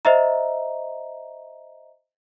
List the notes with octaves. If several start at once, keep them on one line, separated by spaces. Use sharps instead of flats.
C5 D#5 E5 A#5